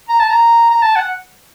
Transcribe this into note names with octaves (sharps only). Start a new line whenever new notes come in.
A#5
A5
A#5
A#5
A5
F#5